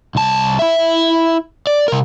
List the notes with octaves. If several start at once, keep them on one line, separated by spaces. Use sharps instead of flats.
C2 A5
E4 E5
D5
C3 A#4